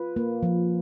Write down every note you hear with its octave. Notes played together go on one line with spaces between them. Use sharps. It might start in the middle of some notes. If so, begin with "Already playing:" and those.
Already playing: F4 B4
A#3
F3